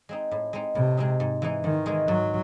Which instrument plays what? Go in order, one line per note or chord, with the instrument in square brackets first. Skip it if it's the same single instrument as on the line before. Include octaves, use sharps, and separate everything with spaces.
[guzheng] G#3 C4 D#4
A2
G#3 C4 D#4
[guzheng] A2 [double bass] C3
[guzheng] G#3 C4 D#4
G#2
E3 G#3 D#4
[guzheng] G#2 [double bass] D#3
[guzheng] E3 G#3 D#4
[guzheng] G#2 [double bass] F#3